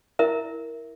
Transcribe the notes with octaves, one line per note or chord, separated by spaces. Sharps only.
E4 A#4 E5